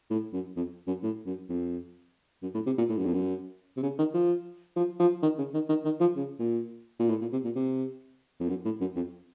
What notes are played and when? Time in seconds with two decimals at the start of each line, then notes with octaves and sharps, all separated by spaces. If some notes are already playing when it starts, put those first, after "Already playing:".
0.10 A2
0.33 F#2
0.56 F2
0.87 F#2
1.03 A2
1.26 F#2
1.49 F2
2.43 F#2
2.54 A2
2.66 C3
2.78 A#2
2.89 A2
2.98 F#2
3.05 F2
3.13 F#2
3.77 C3
3.83 C#3
3.99 D#3
4.14 F3
4.76 F3
5.00 F3
5.23 D#3
5.38 C#3
5.54 D#3
5.69 D#3
5.85 D#3
6.00 F3
6.16 C#3
6.39 A#2
6.99 A#2
7.09 A2
7.21 A#2
7.32 C3
7.44 A#2
7.56 C3
8.40 F2
8.49 F#2
8.65 A2
8.81 F#2
8.96 F2